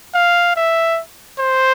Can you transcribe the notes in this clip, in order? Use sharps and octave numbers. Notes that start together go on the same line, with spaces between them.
F5
E5
C5